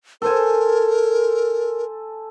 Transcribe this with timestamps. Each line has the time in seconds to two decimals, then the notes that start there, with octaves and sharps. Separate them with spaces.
0.22 A4 A#4 C5 G#5